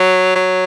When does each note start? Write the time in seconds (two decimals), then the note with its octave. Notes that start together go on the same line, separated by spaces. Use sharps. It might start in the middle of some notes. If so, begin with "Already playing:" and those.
Already playing: F#3
0.36 F#3